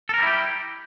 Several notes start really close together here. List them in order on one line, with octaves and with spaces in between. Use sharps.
A4 A#4 G3 E4 G4